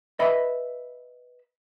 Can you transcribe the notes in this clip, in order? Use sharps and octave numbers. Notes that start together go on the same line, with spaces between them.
B4 D#5 E5 B5